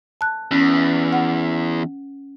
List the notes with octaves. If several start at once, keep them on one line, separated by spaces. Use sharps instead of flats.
A5 F#6
E2 C#4
F#5